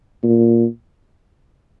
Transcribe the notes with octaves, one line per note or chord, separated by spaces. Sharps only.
A#2